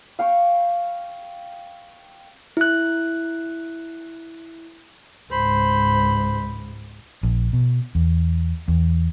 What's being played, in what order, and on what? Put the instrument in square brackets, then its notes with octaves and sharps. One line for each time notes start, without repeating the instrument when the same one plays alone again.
[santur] F5 G5 C#6
[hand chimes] E4 F#6
[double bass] C#2 G#2 [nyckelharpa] C5 B5
[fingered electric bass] A#1
B2
E2
E2